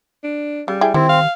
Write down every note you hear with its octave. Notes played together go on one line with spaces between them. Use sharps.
D4
C#3 G3
E4 G#4 G5
D#3 G3 C4 E4
F5